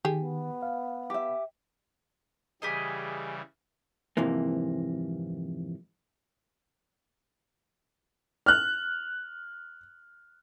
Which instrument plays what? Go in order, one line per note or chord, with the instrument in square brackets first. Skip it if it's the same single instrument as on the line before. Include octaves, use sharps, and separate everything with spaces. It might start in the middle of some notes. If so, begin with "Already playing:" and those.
[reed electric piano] D#3 [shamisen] G4 G#4
[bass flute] B3
[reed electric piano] F5
[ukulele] G4 E5
[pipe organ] C#3 E3 G3 [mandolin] G4 G#4 D#5
[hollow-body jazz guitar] F2 G#2 C3 E3 A#3
[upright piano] F6 F#6